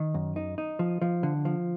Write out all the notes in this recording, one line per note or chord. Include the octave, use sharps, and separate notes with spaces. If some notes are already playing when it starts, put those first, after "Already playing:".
Already playing: D#3
F#2
D#4
D#4
F3
F3
D3
F3